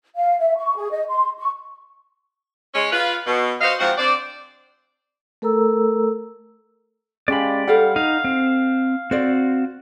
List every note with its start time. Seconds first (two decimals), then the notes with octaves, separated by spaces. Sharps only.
0.16 F5
0.39 E5
0.56 C#6
0.76 G#4
0.91 D#5
1.09 C6
1.39 C#6
2.74 G#3 C#4 C#5
2.92 F4 B4
3.27 B2
3.61 F#4 C5 D#5 F5
3.79 G#2 F3 C4 F#4 C5 F#5
3.98 C4 D4 C5 D5
5.42 A3 A4 A#4 A#5 E6
7.28 G#3 C#4 G4 D5 F5 B5
7.67 G3 A4 C5 F5 F#5
7.96 D#4 F5
8.24 C4
9.11 C4 F#4 C5 D5